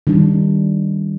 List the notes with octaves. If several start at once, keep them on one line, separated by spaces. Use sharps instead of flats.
D#3 G3 D4 D#4